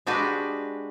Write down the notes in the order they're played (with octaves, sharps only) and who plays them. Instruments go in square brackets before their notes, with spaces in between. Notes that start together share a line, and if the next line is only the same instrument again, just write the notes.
[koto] G#3 D4 F#4 G4 B4